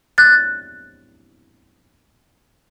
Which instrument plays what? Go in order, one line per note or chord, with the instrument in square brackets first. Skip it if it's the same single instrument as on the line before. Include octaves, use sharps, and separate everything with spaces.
[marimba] F#6 A6